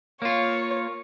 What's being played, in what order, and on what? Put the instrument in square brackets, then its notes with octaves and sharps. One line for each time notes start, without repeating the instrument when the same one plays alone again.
[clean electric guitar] A#3 F4 [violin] C#5